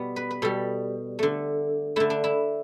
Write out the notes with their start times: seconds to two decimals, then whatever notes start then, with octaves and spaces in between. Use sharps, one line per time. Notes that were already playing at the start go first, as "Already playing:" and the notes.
Already playing: B2 G3 B3
0.16 B4
0.31 B4
0.42 B2 G3 A4
1.19 D3 A3
1.96 D3 A3 E4
2.10 D4
2.24 E4